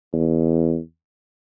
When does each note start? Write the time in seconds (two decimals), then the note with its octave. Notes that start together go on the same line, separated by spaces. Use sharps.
0.13 E2